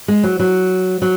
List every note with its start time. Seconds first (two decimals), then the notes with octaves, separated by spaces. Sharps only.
0.08 G#3
0.23 F#3
0.40 F#3
1.02 F#3